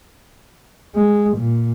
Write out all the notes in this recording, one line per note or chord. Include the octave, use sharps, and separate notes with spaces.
G#3
A#2